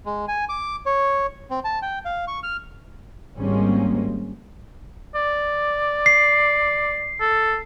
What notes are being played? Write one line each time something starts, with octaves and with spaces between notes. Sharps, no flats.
G#3
G#5
D6
C#5
C4
A5
G5
F5
C#6
F6
G#1 G3 G#3 A#3 C4 C#4
D5
C7
A4